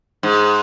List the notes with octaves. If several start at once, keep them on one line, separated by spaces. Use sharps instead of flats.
G#2